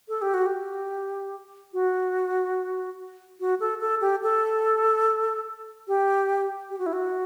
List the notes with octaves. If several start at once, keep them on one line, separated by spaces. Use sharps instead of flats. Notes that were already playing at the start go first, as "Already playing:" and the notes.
A4
G4
F#4
G4
F#4
F#4
A4
A4
G4
A4
G4
G4
F#4
E4
F#4